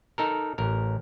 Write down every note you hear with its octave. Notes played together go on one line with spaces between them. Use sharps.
D#4 A4 A#4
A1 A#4